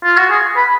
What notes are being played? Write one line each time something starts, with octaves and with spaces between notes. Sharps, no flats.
F4
F#4
G#4
B4